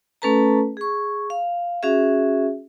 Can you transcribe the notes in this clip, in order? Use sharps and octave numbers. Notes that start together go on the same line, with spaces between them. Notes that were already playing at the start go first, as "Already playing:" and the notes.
A3 C#4 A4 B4 A5 A#5
G#4 C#6
F5
C#4 F#4 G#4 E5